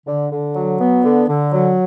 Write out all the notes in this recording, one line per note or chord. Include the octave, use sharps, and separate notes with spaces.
D3
D3
F#3
B3
D3
D3
F#3